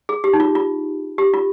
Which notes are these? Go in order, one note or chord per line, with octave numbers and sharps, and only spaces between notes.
G#4
G4
D#4
F4
F4
G4
F4